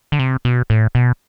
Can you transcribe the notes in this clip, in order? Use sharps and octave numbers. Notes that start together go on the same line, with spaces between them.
D3
C3
B2
A2
B2